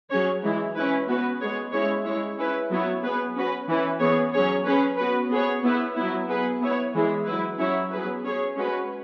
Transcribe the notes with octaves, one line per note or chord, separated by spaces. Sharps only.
F#3 C#4 G#4 C#5
E3 G#3 E4
C#4 E4 B4
B3 F#4 B4
G#3 B3 G#4 C#5
G#3 C#4 E4 C#5
G#3 E4 C#5
C#4 E4 B4
F#3 B3 E4 C#5
B3 G#4 B4
C#4 F#4 B4
E3 C#4 E4 B4
E3 B3 G#4 C#5
F#3 C#4 G#4 C#5
C#4 G#4 B4
B3 F#4 B4
B3 G#4 C#5
B3 E4 B4
F#3 B3 E4
B3 G#4 B4
B3 E4 C#5
E3 G#3 E4 G#4
F#3 E4 B4
F#3 C#4 E4 C#5
F#3 B3 G#4 B4
C#4 G#4 C#5
G#3 C#4 F#4 B4